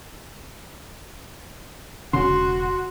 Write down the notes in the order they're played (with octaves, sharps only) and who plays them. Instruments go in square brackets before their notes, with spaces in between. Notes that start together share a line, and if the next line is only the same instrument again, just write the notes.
[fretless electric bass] E1 C#3 C#4 [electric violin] F#4 [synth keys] C6